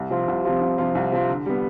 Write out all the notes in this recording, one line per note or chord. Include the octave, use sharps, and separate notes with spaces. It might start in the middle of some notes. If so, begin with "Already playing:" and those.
Already playing: C2
C3 F3 C4 F4
C2
C3 F3 C4 F4
C2
C3 F3 C4 F4
C2
C3 F3 C4 F4
D3
G3 B3